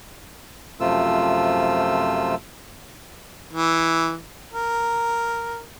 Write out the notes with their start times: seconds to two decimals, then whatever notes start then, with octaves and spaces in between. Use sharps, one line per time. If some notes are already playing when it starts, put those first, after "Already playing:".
0.80 F#2 C3 F3 A3 F4 E6
3.53 E3
4.53 A#4